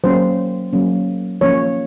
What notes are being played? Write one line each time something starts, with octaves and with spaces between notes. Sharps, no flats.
F#3 A#3 C#4 C5
F#3 A#3 C#4
F3 A#3 C#4 C#5